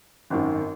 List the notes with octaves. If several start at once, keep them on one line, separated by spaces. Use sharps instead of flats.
G#1 F#2 D#3